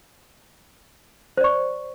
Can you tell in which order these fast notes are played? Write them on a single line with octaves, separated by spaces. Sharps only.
C5 D5 C#6